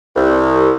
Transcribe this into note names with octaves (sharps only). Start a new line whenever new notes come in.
C2